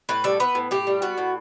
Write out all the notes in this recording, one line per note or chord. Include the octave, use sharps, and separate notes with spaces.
A2 B4
G3 A4
B3 B4
A2
A2 G4
G3
B3 F#4
A2